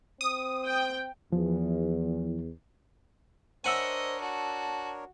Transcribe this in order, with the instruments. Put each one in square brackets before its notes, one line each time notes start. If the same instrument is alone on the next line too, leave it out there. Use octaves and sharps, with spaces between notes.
[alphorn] C4 [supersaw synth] D#6
[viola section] G5
[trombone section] E2 [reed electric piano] F3
[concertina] D4 A#4 C#5 [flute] C5 [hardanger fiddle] D#5 [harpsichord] E5 F#5 G#5
[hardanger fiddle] F#4 [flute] A5